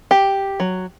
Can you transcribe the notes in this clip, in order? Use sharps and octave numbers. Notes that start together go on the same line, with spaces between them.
G4
F#3